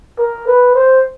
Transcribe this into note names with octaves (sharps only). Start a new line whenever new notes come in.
A#4
B4
C5